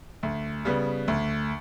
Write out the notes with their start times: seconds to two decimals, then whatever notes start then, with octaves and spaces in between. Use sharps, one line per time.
0.23 D2
0.65 C#3 G3 B3
1.08 D2